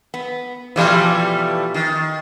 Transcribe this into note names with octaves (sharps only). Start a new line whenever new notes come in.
B3
B2 E3 F3 G3 A3 F5
D#3